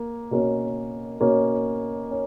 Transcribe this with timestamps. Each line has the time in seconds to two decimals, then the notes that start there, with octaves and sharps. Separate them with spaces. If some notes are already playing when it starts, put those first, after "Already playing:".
Already playing: A#3
0.31 B2 A#3 C#4
1.21 B2 A#3 C#4
2.11 C#4